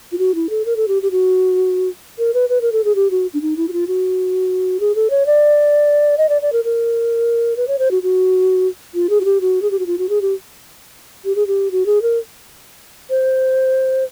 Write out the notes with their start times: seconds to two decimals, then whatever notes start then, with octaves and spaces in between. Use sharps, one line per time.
0.12 F4
0.19 F#4
0.35 E4
0.50 A4
0.65 A#4
0.76 A4
0.88 G4
1.02 G4
1.11 F#4
2.18 A#4
2.34 B4
2.49 B4
2.61 A#4
2.72 A4
2.84 G#4
2.95 G4
3.11 F#4
3.34 D4
3.42 D#4
3.57 E4
3.68 F#4
3.73 F4
3.88 F#4
4.80 G#4
4.95 A4
5.10 C#5
5.26 D5
6.18 D#5
6.29 D5
6.42 D5
6.53 A#4
6.64 A#4
7.57 B4
7.68 C#5
7.79 C5
7.91 F#4
8.03 F#4
8.95 F4
9.10 G#4
9.21 F#4
9.25 G4
9.41 F#4
9.62 G#4
9.71 G4
9.79 F#4
9.87 F4
9.98 F#4
10.09 G#4
10.22 G4
11.25 G4
11.36 G#4
11.47 G4
11.71 F#4
11.86 G#4
12.02 A#4
13.10 C5